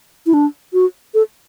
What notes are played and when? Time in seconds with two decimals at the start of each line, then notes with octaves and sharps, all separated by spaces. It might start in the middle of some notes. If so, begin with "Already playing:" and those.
0.26 E4
0.34 D4
0.73 F#4
1.14 A4